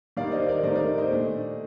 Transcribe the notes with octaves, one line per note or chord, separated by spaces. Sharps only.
D#3 G3 A#3 D5 F5
D5
C5 D#5
A#4 D5
C3 D#3 A3 D#4 C5 D#5
A#4 D5
C5 D#5
A#2 A3 D4